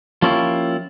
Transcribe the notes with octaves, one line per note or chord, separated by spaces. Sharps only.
F3 A#3 C#4 E4 F4 G4